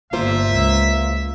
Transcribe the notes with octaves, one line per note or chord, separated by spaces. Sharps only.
G1 A#3 F4 C5 E5
C#2